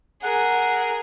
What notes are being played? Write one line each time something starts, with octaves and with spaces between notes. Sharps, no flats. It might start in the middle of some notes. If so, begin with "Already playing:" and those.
G#4 A#4 F#5